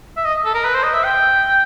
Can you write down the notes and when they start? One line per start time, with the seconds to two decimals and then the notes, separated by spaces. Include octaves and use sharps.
0.17 E5
0.25 D#5
0.45 A4
0.54 A#4
0.65 B4
0.75 C5
0.84 D#5
0.94 E5
1.04 G5